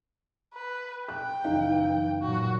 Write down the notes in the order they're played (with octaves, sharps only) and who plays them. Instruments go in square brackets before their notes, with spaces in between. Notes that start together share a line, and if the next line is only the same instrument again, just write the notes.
[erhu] B4
[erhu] G5 [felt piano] F#6
[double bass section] F#1 E3 [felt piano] D#4 F5
[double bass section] A#2 F#3 [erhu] F#4